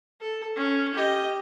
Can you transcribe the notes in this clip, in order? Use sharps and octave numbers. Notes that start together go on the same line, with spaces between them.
A4
C#4
G4 D#5